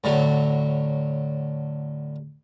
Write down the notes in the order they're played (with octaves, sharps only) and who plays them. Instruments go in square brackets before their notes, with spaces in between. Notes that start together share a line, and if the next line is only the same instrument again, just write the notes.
[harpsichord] A2 D3 F#3